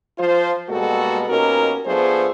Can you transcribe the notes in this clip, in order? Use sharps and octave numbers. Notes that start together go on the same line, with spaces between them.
F3 F4 C5
B2 G3 G#3 A#3 F#4 A4
B2 A#3 C#4 D#4 G4 A#4
F3 A3 B3 D4 G#4 C5